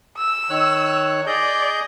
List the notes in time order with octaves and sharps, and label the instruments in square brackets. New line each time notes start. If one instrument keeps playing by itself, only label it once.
[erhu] E6
[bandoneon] D#3 C#5 F#6
[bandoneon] G#4 D#5 G6 [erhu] D5